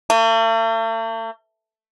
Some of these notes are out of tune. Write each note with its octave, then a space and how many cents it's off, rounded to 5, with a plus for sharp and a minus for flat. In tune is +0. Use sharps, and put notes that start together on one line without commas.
A3 +45